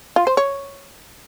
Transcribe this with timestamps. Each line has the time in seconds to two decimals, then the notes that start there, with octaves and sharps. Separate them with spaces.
0.16 F4
0.27 C5
0.37 C#5